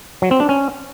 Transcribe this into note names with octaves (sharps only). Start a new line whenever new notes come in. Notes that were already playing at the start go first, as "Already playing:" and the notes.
F#3
C4
D4
C#4